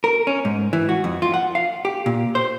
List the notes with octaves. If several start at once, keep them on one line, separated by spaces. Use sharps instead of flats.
A#4
C#4
G#2
E3
F#4
F2
F4
F#5
F5
G4
A#2
C5